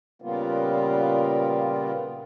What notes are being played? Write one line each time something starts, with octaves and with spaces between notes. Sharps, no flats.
A#2 C#3 G3 A#3 B3 F4